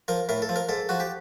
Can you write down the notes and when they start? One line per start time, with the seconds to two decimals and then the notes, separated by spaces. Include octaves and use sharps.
0.08 F3 A#4
0.29 A2 A#4
0.42 A4
0.49 F3
0.56 A#4
0.69 G#2 A4
0.89 F3 F#4
1.00 G4